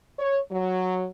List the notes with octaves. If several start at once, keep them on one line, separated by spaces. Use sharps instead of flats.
C#5
F#3